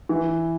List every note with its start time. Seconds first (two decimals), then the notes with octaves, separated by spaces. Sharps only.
0.09 E3